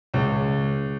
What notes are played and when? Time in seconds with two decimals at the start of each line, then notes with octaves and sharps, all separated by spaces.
0.14 C#2